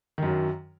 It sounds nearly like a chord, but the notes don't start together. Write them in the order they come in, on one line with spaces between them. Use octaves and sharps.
D#3 F#2 F#3